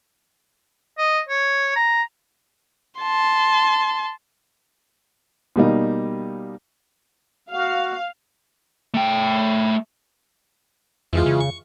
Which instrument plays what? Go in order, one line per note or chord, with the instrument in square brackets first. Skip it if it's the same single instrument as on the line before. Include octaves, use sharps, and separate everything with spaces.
[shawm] D#5
C#5
A#5
[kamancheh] A5 C6
[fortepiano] B2 G3 A#3 D#4
[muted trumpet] F#4 [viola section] F5
[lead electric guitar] A3 G5
[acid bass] F2 [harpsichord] E3 G#3 F4
[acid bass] C#3
[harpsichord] C#6